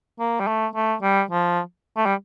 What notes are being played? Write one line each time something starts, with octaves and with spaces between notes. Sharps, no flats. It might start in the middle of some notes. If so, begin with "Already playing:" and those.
A#3
G3
A3
A3
G3
F3
A3
G3